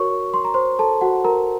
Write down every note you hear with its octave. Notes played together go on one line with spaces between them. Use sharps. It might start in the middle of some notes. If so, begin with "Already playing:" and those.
Already playing: F#4 A#4 C#5 C#6
C6
A#5
C5 C6
A4 A5
F#4 F#5
A#4 A#5